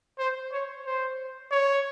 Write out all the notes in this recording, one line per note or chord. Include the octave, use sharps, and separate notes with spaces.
C5
C#5
C5
C#5